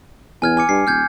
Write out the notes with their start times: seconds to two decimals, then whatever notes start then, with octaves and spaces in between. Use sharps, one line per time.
0.42 E2 G#5 F6 G#6
0.57 G#5 D6 C#7
0.69 G2 C7
0.87 D#1 F6 G6 G#6